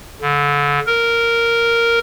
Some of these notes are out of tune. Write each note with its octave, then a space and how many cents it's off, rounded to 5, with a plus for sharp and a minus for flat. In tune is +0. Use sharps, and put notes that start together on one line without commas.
D3 -30
A#4 -5